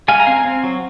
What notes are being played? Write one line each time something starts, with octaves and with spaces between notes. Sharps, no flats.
G#3 F5 G#5
A#5
C4 F5 G#5
C4
F#3